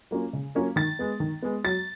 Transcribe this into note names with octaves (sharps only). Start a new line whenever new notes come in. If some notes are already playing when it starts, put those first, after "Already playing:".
F#3 A#3 C#4 F4
C#3
F#3 A#3 C#4 F4
D#3 A6
G#3 B3
D#3
G#3 B3
F#3 A6